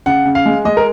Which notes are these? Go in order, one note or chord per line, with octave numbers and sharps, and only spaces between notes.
C#3 F#5
C#3
F5
G#3
G#3 D#5
A#4